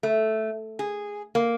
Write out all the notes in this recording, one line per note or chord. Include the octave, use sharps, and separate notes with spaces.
A3
G#4
A#3